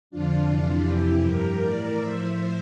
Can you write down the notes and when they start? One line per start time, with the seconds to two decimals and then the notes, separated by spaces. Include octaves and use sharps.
0.10 F2 D3 F3 D4 F4
0.48 F2 C3 E3 D4 F4
0.85 F2 C3 E3 E4 G4
1.23 G2 F3 G4 A#4
1.60 A2 E3 A#4 D5
1.97 A2 F3 C5 E5